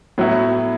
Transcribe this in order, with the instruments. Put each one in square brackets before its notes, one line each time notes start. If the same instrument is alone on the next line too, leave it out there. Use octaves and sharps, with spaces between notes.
[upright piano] A2 F#3 B3 E4